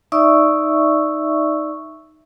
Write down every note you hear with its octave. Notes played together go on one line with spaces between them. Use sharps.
D#4 D5 E5 C#6 E6